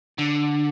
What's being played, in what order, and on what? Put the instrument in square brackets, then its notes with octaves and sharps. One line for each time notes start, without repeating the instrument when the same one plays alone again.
[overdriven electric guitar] D3